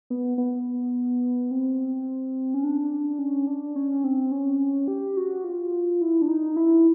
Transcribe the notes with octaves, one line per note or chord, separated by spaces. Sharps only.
B3
B3
C4
C#4
D4
C#4
D4
C#4
C4
C#4
G4
F#4
F4
E4
D4
D#4
E4